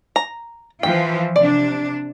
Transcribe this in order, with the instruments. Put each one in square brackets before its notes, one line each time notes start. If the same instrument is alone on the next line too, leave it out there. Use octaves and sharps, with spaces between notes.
[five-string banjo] A#5
[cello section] E3 F3 F4 [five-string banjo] G5
[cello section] C3 D4 [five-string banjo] D5